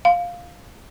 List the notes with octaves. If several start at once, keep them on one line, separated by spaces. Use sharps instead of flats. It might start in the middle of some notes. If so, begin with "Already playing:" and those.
F5